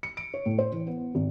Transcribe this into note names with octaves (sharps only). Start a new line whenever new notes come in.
C#7
D7
C#5
A2
C5
E3
B3
G#1